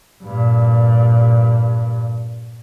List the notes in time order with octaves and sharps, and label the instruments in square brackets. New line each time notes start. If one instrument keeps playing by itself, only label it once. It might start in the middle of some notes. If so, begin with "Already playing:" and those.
[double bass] G2 A#2